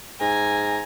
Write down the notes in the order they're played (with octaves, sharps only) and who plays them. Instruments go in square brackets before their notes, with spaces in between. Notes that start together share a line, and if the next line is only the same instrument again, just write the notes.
[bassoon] G#2 [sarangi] G#5 [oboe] A#5